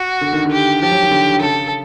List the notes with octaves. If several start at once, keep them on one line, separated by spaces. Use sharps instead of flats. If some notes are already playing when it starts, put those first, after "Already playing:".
Already playing: F#4
D3
D#3
D3
G4
F3 G4
F#3
D#3
D3
C#3 A4